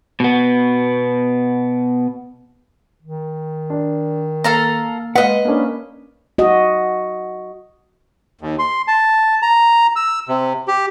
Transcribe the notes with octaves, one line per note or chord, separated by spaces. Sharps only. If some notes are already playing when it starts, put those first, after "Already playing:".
B2 B3
D#3
D4
A#3 A4 F5 A#5
G#3 B4 D#5 F5 F#5
A#3 C#4 D4
F#4 D#5
D#2
C6
A5
A#5
E6
C3
G4